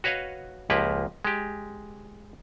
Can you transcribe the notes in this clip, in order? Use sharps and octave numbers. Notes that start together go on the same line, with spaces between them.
F#4 B4 C#5 D#5 F5
C#2 F3 A#3 G4 B4
G#3 G4